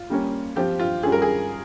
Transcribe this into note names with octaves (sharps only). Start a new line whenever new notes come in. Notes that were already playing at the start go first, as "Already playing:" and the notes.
Already playing: F4
G3 A#3 C#4
F3 C4 F4 G4
F4
G3 C#4 F4 G#4
A#4
G#4